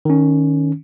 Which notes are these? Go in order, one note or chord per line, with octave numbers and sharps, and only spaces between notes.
D#3 C#4